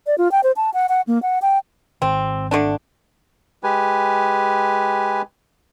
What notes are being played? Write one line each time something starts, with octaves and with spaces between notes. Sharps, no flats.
D5
F4
G5
C5
A5
F#5
F#5
A#3
F#5
G5
G#1 C4
D3 A3 D4
G#3 G4 B4 G#5